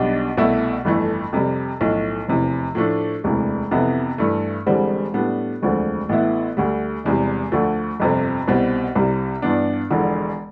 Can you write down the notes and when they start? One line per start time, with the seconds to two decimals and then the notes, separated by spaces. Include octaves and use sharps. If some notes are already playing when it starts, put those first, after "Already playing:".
Already playing: B1 B2 G3 D4
0.37 C2 B2 A3 E4
0.85 G1 F2 E3 A3
1.33 F2 C3 G3
1.81 B1 A2 F3
2.28 F1 E2 C3 E3
2.75 A2 F3 A3 D4
3.24 E1 D2 C3 E3
3.71 F2 C3 E3 B3 E4
4.18 G2 E3 A3
4.66 E1 E2 D3 G3 C4
5.14 A2 G3 B3 D4
5.62 E1 D2 D3 F3 C4
6.09 A1 A2 E3 B3 E4
6.57 D2 D3 G3
7.04 E1 E2 C3 G3
7.52 D2 D3 F3 A3
7.99 G1 F2 C3 F3 C4
8.48 C2 B2 G3 C4
8.96 C2 C3 G3
9.42 G2 E3 B3 D4
9.90 E1 E2 D3 F3